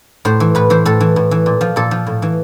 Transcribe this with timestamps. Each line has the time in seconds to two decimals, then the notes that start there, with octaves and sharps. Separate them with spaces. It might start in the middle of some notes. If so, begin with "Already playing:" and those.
0.25 A2 C5
0.40 E3
0.55 A2 B4
0.70 E3 C5
0.85 A2 A4
1.00 E3
1.16 A2
1.31 E3
1.46 A#2
1.61 F3
1.76 A#2 A4
1.91 F3
2.07 A2
2.22 E3